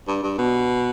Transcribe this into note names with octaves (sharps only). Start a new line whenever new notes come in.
G2
G2
B2